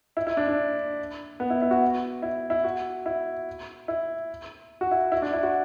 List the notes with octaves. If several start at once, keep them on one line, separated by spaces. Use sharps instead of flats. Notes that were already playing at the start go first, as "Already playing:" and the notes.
E4
E4
D4
D4
B3
E4
E4
F#4
E4
E4
F#4
E4
E4
F#4
E4
E4
D4
E4
F#4